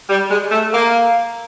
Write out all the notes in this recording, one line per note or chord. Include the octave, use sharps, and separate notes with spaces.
G3
G#3
A3
A#3